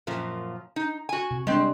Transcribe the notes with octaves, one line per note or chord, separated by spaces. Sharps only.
F#2 A#2 F3
D#4
F#4 G#5
C3
G3 G#3 C4 D4